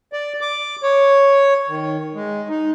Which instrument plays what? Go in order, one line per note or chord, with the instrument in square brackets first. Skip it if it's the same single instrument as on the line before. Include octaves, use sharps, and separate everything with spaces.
[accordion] D5
D6
C#5
D#3
G#3
D#4